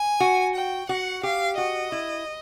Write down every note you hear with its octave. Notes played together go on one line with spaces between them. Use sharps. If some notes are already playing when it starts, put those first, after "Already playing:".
Already playing: G#5
F#4
G5
F#4 F#5
G4 F5
F#4 D#5
E4